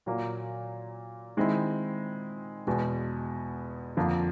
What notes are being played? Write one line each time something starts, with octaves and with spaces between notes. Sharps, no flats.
A#2 F#3 A#3
D#3 G#3 C4 E4
E2 B2 G#3
F2 D3 F3 A#3